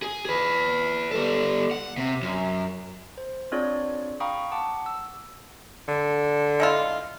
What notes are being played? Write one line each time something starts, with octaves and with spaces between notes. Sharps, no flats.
G#4
G#4 B4
G3 A4
F#5
C3
F#2
C5
C4 D4 F4 G#4 C#5 D5
F5 G5 A#5 B5 C#6 D#6
F#5 A5 D6
E6
D3
G#3 E4 F4